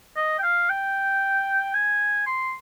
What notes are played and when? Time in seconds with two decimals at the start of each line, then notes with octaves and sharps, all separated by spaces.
0.16 D#5
0.39 G5
0.43 F5
0.70 G5
1.74 G#5
2.27 C6